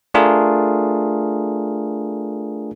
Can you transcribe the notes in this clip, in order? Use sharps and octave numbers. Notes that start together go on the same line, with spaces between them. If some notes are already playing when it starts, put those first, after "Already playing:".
A3 D4 F4 G#4 A#4